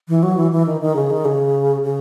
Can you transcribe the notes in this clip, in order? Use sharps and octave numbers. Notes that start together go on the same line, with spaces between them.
E3
F#3
E3
E3
D#3
D#3
C#3
D#3
C#3
C#3